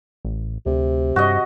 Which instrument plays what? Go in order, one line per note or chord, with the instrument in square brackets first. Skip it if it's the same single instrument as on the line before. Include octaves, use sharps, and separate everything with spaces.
[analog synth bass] A1
[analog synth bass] D2 [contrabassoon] C3
[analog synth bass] G2 [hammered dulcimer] F#4 D#5